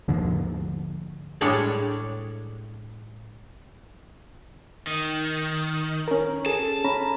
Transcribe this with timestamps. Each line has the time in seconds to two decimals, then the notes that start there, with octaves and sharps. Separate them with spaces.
0.08 D#2 G#2 D3 F3
1.41 A2 G3 G#3 D4 C#5 D5
4.87 D#3
6.08 C#4 A#4
6.46 G#4 A4 A5
6.85 C#4 A#5 B5